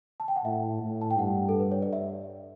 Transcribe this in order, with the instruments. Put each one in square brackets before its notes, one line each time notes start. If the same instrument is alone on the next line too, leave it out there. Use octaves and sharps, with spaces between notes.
[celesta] A5
G5
F#5
[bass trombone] A2 [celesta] E5
[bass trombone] A2
[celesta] A5
G5
[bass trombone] G2 [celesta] F#5
[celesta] A4
B4
C#5
D5
E5